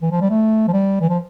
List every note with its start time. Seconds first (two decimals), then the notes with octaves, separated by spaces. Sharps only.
0.02 E3
0.11 F3
0.21 G3
0.30 A3
0.68 F3
0.73 G3
1.01 E3
1.10 F3